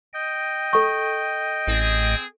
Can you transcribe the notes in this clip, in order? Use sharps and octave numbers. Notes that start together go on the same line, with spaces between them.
D#5 G5
A4 C#6
A1 C4 G#4